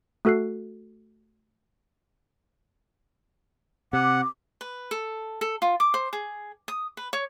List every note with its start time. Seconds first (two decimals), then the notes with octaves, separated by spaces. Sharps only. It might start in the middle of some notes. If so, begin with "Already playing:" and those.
0.25 A3 F#4 A4 F#6 C7
3.93 C3 F#5 D6
4.61 B4
4.91 A4
5.41 A4
5.62 F4
5.80 D6
5.94 C5
6.13 G#4
6.68 D#6
6.97 B4
7.13 C#5